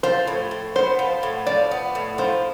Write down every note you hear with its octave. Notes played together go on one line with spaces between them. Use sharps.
F3 C5
A2
A2
B3 C5
F3
A2
F3 D5
B3
A2
F3 C5